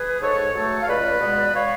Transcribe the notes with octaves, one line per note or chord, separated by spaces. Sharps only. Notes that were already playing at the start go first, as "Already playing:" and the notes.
Already playing: G#4 B4
G#2 A4 C#5
F#3 A3 A4 C#5
F5
C#2 B4 D5
B2 G#3 B3
C#5 F5